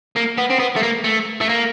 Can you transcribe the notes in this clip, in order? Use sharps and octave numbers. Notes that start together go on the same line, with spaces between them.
A#3
B3
C4
B3
A3
A#3
A3
A3
A#3